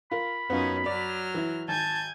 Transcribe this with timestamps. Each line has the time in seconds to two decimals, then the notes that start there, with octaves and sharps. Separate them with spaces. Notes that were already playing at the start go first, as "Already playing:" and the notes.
0.11 F4 A#4 B5
0.50 F#2 B3 C#4 D#4 F4
0.86 F#3 D5 F6
1.34 E3 E4
1.68 G#1 G#5 A5 G6 G#6